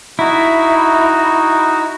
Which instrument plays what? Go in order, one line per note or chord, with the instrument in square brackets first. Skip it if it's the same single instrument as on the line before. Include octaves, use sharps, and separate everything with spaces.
[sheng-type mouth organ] D#4 F#4 [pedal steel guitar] E4